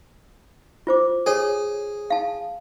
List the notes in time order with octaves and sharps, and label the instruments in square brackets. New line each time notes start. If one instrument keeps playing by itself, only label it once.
[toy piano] F4 C5 D6
[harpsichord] G#4 [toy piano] A4 C#5
[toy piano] F5 A5